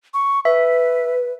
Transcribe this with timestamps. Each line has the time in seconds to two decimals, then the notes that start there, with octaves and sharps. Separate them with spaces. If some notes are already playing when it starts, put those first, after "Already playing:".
0.14 C#6
0.45 B4 E5